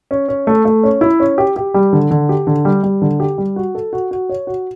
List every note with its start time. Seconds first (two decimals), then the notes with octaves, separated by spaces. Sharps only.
0.11 C#4
0.29 C#4
0.47 A3
0.65 A3
0.83 C#4
1.01 E4
1.20 C#4
1.38 G4
1.56 G4
1.74 G3
1.93 D3
2.11 D3
2.29 G4
2.47 D3
2.65 G3
2.83 G3
3.02 D3
3.20 G4
3.38 G3
3.56 F#4
3.75 A4
3.93 F#4
4.11 F#4
4.29 C#5
4.47 F#4